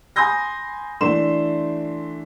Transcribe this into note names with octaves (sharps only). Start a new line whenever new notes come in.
G#5 B5 C6 D#6 G6 A#6
E3 A3 D4 C6 E7